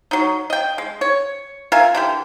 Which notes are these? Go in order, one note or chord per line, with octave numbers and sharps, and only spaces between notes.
F#3 D#4
D#5 G5
G#3
C#5
F4 A#4 E5 G#5
D3 E3 G4